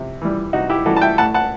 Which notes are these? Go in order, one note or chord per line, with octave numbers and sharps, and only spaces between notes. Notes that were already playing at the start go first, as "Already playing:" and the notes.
Already playing: C3
E3 G3
C3 D#4 F#4
E4 G4
E3 G3 F#4 A4
A5
E5 G5
A2 F#5 A5
F#5 A5